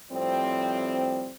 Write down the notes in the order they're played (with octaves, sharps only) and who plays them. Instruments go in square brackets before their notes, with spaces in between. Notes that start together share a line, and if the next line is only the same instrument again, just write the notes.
[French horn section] A2 F3 G3 C4